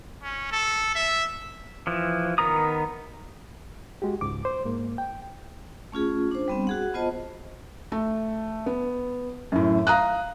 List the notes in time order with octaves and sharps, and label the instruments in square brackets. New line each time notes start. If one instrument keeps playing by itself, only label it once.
[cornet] C#4
A4
E5
[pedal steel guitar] E3 F3
D#3 B3 A#4 A#5 D#6
[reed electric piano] G#3 F#4 G4
C#2 G#2 D6
C5
G#2 A#3
G5
[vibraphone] A3 C#4 F4 G#4
D4 C5
G3 B3 C4
F#4 G#4 F#5
B3 F4 C5 D#5 A5
[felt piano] A3
B3
F#2 A2
F5 A#5 D#6 F#6